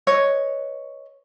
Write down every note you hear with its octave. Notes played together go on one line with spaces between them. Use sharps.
B4 C#5 D#5